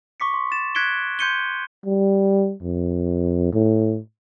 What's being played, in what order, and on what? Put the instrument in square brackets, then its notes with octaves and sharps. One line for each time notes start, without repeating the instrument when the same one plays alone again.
[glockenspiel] C#6 D6 B6 C#7
C6
A6 E7
F#6 G#6 B6 C#7 D7 G7
C6 G6 G#6 C#7 D#7 G7
[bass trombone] G3
F2
A2